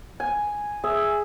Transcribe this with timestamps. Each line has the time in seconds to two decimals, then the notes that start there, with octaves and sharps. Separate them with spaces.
0.20 G#5
0.84 G#4 E5